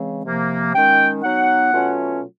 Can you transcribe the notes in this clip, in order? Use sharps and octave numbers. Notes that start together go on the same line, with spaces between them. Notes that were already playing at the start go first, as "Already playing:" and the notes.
Already playing: C#3 E3 G#3 C4
C3 F3 A#3
D#3 G#3 C#4 G5
F#3 B3 D#4 F#5
B2 F#3 A3 C#4 F4